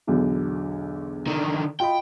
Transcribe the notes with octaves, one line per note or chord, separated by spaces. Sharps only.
B1 E2 D3
D3 D#3
F4 D#5 G5 B5